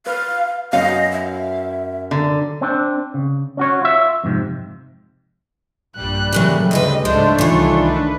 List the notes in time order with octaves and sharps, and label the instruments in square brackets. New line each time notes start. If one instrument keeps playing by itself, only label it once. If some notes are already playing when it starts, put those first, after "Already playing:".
[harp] B4 F6 [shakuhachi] F5
[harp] F#2 [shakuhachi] D#5 [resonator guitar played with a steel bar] F5
[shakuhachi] E5
[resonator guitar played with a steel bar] D3 [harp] A#5
[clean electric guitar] C4 D4
C#3
C#4 F#4 C#5
F4 E5
F2 G#2 C3
[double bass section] A#1 G2 [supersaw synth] G3 [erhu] F#6
[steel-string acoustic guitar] A#2 E3 F#3 [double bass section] C#3 A3
[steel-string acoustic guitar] D2 G#2 B4 [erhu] D#5
[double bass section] C#2 G#2 [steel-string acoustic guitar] G#3 [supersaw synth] A3 D4 [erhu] C5
[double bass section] C2 D#3 [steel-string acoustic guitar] E3 F4 [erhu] C#5
[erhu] B4